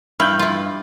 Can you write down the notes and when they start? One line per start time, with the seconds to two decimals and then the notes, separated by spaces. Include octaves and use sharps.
0.20 G2 E4 F6 G6
0.39 E4 F4